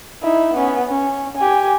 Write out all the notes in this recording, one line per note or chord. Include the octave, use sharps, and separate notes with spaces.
D#4 E4
B3 C#4
C#4
G4 G#5